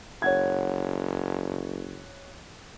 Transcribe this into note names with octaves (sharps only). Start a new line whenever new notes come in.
F#1 C#5 F#5 G#6